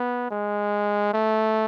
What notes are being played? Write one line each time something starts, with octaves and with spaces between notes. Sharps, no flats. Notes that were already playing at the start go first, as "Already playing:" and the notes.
Already playing: B3
G#3
A3